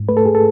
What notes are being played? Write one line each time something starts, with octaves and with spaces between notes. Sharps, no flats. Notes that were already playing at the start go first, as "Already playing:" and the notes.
Already playing: G#2
A3 B4
A4
G#4
A4